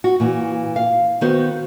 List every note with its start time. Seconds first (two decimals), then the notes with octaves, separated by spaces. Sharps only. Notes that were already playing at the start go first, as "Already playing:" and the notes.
0.04 F#4
0.20 A#2 E3
0.76 F5
1.21 D#3 B3 F#4 C5